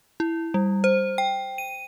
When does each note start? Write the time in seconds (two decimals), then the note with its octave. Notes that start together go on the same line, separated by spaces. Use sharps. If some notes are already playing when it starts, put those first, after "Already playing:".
0.20 E4
0.54 G3
0.84 C5
1.18 G5
1.58 D#7